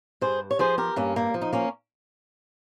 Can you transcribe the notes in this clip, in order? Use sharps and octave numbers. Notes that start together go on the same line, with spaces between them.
G2 G#4 C5
C#5
F3 G#4 C5
G4 A#4
G2 A#3 C#4
G3 A#3
F3
D#4
A#3 C#4